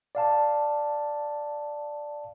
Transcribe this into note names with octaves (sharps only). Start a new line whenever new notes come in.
D5 F5 A5